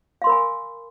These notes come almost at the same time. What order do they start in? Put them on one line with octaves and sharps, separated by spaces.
F5 C6 A#4 B5 G#5